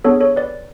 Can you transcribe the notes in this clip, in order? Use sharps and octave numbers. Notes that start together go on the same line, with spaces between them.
B3 D4 G#4 A4 C#5
A4 C#5
B4 D5